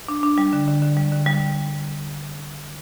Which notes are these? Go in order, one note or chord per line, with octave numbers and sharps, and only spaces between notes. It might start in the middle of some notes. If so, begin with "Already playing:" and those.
D4
D4
G3
D3
D3
D3
G3
D3
G3